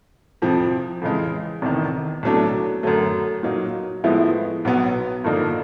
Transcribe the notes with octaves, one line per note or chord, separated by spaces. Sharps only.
F2 C3 F3
F2 C#3 E3 G#3
F1 E2 C3 D#3
C2 B2 F#3 A3 D4
F#2 D3 F#3 A3
A#2 F#3 A#3 D#4
A2 F3 G#3 B3 E4
B1 B2 F#3 B3
G2 D3 F3 A#3 D#4